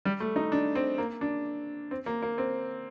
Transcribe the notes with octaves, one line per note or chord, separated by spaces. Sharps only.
G3
A3
D#4
D4
C4
A#3
D4
C4
A#3
A#3
C4